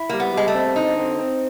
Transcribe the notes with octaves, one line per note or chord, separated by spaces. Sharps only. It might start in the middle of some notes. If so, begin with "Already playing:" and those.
Already playing: E4
G3 A#3
B3
G3 G#3
A3
C4
D3 D#4
C4
C4